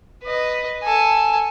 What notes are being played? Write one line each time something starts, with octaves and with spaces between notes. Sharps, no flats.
B4 D#5
A4 G#5